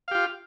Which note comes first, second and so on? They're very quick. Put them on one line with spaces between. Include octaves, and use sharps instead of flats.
F5 G4 F4